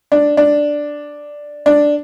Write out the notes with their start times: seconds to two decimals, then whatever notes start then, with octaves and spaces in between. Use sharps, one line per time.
0.12 D4
0.37 D4
1.66 D4